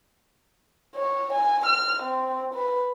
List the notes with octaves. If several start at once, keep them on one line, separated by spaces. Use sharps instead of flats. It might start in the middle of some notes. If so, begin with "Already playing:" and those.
C#5
G#5
F6
C4
B4